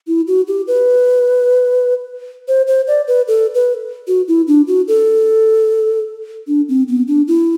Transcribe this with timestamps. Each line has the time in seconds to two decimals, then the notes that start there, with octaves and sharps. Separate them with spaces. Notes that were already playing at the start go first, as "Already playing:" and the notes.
0.07 E4
0.27 F#4
0.48 G4
0.68 B4
2.48 C5
2.67 C5
2.88 D5
3.08 B4
3.28 A4
3.55 B4
4.08 F#4
4.28 E4
4.48 D4
4.67 F#4
4.88 A4
6.48 D4
6.69 C4
6.88 B3
7.08 D4
7.28 E4